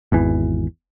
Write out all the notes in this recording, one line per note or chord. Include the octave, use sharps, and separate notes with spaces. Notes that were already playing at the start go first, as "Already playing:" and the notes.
G#1 E2 E3